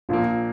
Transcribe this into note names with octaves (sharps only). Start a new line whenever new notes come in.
A#1 A#2 F3 A#3 F4